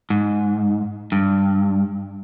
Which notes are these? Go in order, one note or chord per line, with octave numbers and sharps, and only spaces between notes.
G#2
G2